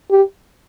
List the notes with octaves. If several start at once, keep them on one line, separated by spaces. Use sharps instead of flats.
G4